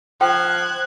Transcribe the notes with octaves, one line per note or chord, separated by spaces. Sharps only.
F3 G5 F#6 G#6